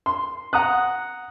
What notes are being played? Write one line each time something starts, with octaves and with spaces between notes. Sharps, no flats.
C6
F#5 A#5 D#6 F#6